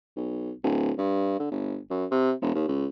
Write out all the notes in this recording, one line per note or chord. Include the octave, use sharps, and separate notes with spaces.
B1
D1
G2
D3
G1
F#2
C3
E1
D#2
C#2